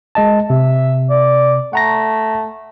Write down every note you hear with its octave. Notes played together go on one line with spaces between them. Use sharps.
G#3 D#5 A5
C3 E5
D5
A3 F#5 A#5 A#6